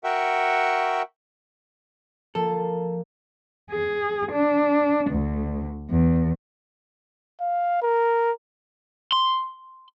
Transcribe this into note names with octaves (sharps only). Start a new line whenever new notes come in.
F#4 A#4 E5 F#5 G5 C#6
F3 A#3 A4
G#4
D4
D2
E2
F5
A#4
C6